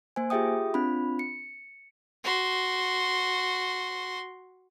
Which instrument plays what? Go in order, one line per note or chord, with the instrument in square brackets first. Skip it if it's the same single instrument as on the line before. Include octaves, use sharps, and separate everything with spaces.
[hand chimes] A#3 C5 G#5
F4 G4 G#4 E5 G5 D#6
C4 D4 F4 B5
C#7
[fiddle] F#4 C6